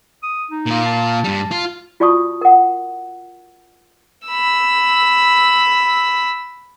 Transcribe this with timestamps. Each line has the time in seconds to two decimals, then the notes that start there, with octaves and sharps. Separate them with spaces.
0.23 D#6
0.51 D#4
0.66 A#2 F4
0.86 A5
1.24 G2 G3
1.51 F4
2.00 F4 F#4 D5 A5 C#6 D#6
2.41 A#4 F#5
4.27 B5 E6